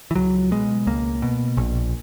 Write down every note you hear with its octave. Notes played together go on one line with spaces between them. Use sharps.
E3
C#2 F#3
B2 G#3
C#2 A#3
B2
A#1